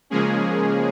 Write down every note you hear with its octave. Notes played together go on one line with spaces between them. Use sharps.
C#3 F3 G#3 A#3 C#4 G#4